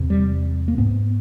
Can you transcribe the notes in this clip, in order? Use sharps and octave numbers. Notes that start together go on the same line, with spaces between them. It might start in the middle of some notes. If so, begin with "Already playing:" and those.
Already playing: E2 C3
G3
A#3
G#2 B3